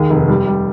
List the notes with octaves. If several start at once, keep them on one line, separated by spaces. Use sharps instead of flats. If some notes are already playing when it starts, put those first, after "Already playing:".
Already playing: D#2 G#4
F1
G3
G3